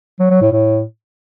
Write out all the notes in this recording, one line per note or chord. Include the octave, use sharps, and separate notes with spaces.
F#3
F#3
A2
A2